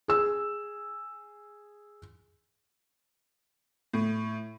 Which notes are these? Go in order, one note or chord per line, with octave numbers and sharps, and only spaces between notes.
G#4 E6
A2